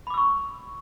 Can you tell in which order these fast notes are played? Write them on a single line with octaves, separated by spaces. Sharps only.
B5 D6 E6 C#6